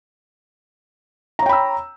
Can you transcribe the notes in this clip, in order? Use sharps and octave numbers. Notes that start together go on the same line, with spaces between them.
C#5 G5 A#5 B5 E6